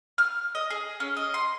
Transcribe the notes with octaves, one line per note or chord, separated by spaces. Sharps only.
F6
D#5
G#4
C#4
D#5
C6